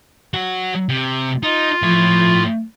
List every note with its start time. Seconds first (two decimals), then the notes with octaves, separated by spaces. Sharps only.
0.34 F#3 F#4
0.89 C3
1.43 D#4 F4
1.83 A2 F3 C#5